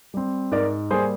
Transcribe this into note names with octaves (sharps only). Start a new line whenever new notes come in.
G3 C4
G#2 A#4 D5
G3 A#3 G#4 C5